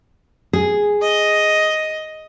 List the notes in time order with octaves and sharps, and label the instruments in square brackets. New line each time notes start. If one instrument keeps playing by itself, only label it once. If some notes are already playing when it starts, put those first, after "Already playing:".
[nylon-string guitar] G#4
[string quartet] D#5